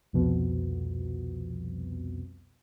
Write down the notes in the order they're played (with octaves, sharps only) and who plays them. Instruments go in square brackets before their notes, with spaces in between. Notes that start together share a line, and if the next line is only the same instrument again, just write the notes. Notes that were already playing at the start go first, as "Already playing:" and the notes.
[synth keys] C2 F2 B2